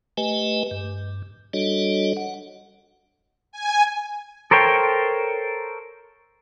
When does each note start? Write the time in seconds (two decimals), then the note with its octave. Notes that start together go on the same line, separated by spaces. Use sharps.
0.17 A3 G4 B4 D#5 G#5
0.71 G2
1.53 G3 D4 F#4 A4 C#5 D#5
2.17 F#5
3.52 G#5
4.51 A4 A#4 C5 C#5 G5